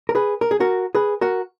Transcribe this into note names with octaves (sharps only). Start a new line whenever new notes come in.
A#4
G#4 B4
A#4
G#4
F#4 A#4
G#4 B4
F#4 A#4